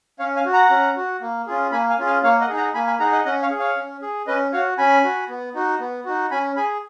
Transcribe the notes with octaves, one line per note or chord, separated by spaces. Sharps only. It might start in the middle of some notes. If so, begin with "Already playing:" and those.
C#4 C#5 F5
F5 G#5
F#4
F#5 A#5
C#4
F#4
A#3
C#4 F4 G#4
A#3 G#5 B5
F5 G#5
C#4 F4 G#4
F5 G#5
A#3 C#5 F5
D#5 F#5
D#4 G#4
F#5 A#5
A#3 G#5 B5
G#5 B5
D#4 G#4 F#5 A#5
D#5 F#5
C#4 D#5 F#5
C#5 F5
G#4
C#5 F5
C#4
G#4
C#4 B4 D#5
F#4 C#5 F5
C#4 G#5 B5
F#4
B3
D#4 F#4
B3
D#4 F#4
C#4 G#5 B5
G#4 G#5 B5